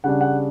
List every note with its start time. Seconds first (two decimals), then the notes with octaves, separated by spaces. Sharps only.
0.04 C#3 G3 D4 F#5
0.21 F#5